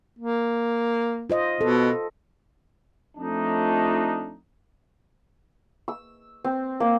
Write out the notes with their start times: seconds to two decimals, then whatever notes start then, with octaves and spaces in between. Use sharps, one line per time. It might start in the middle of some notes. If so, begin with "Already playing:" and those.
0.19 A#3
1.30 F4 C5 D#5
1.61 B2 A4
3.18 F2 F3 A3 D4 D#4
5.88 E6
6.44 C4
6.80 A#3